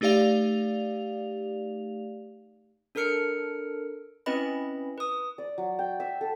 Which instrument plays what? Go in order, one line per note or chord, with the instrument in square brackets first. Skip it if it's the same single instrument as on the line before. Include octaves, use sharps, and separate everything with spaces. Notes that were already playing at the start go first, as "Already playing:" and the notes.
[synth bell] A3 D#4 G4 D5 F5 F7
[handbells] D4 A4 A#4 F6 C#7 D7
C4 C#4 E4 B4 D#5 B5
B4 D#6
[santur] D5
F#3
G5
E5
A4